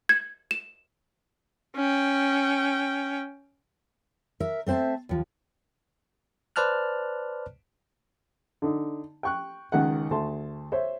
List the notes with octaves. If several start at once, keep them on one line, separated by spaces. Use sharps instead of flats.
G#6
E7
C#4 G5
A#4 E5
A3 C4 C5 E5 A5
D#2 F3
B4 C5 D5 A5 F6 F#6
D3 D#4
G5 C#6 F#6
C#2 D#3 F#5
D2 A3 A5 C6
C5 C#5 E5